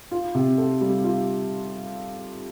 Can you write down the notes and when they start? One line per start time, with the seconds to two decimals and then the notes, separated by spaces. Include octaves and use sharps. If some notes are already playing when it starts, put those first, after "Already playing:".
0.11 F4
0.35 C3
0.58 A4
0.81 G3
1.04 F4